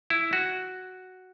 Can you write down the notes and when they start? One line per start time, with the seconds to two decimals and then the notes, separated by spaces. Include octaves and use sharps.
0.10 E4
0.33 F#4